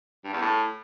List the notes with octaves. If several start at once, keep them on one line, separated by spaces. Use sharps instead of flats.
G2
E2
A2